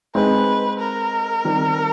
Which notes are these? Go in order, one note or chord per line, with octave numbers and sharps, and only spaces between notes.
G#3 C4 D#4 B4
A#4
D#3 G3 C4